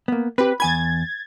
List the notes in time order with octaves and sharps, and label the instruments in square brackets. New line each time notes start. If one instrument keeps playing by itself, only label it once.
[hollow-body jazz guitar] A#3 B3
[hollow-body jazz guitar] C4 G4 [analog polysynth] B4
[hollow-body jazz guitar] E2 G#5 B5 [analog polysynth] G#6 A6